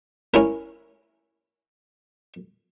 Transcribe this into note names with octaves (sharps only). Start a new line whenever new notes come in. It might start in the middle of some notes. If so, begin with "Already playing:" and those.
C#4 E4 A#4